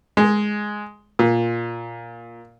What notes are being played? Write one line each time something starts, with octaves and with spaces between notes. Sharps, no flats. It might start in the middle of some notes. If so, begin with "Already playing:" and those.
G#3
A#2